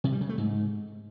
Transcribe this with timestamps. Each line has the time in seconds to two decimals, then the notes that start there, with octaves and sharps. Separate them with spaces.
0.04 C3
0.12 G3
0.21 C#3
0.29 A3
0.38 G#2